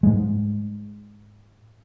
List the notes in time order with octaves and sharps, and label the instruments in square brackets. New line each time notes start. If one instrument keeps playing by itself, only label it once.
[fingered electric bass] G#2 G#3